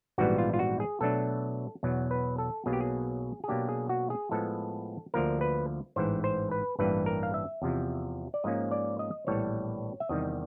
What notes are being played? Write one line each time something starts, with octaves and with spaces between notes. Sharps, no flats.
A#1 G#2 E3 G3 B3 F#4
F4
F4
F#4
G#4
B2 F#3 A3 D4 A4
E2 B2 F#3
B4
A4
B1 B2 F#3 A#3 G#4
G4
G#4
G#4
B2 F#3 A#3 D4 G4
G#4
F#4
G#4
A2 F3 G#3 B3 A4
D2 D3 F3 A#3 A#4
B4
A1 G#2 E3 C5
C5
B4
A1 G2 E3 G3 A#3 B4
A#4
F5
E5
E2 C3 F3
D5
G#2 F3 A#3 C#4 D#5
D5
D#5
A#1 A2 E3 G3 B3 C#5
E5
E2 C3 D#3 G3 D#5